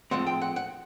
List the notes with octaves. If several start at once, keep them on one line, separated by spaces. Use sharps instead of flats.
A2 F3 G#3 C4 F#5
G5
F#5
F#5